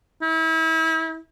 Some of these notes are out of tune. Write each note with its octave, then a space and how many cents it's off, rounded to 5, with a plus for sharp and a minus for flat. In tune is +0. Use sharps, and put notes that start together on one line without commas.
E4 -35